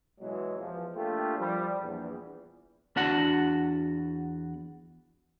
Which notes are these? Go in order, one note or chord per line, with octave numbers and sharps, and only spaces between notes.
B2 E3 F#3 G#3
E2 F3
A3 A#3 D4 F4 G4
F3 G3
A#1 E2
E2 D4 F#4 F#5